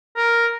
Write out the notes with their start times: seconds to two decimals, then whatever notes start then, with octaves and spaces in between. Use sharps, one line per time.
0.17 A#4